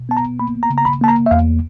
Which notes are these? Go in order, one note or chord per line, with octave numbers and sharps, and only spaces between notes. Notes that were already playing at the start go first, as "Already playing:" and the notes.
Already playing: B2
B3 A5
A#5
A#3 B5
A#5
C#3
A#5
B5
A#3 A5
A#5
E5
E2 F5